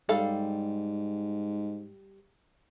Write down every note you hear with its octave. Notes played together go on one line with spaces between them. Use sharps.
G#2 G3 A4 F5